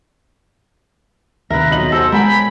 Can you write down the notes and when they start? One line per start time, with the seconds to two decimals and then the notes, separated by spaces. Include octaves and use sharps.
1.50 D#2 C3 A#4 B4 E5 A#6
1.71 B1 D#4 F4 F#7
1.92 A4 C5 G#5
2.12 G#3 A#4 G5 G#5 B5